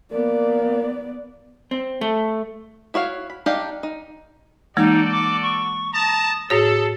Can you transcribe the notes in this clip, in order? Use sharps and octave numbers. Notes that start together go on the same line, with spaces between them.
A#3 B3 D5
C4
A3
E4 F#4 C#5 F5
B5
D4 D#4 G4 D5 F5
D#4
E3 G#3 A#3 D#4 F#4 A4 D5
D6
C#6
A5 A#5 D#6
A2 F#4 G#4 A4 C#5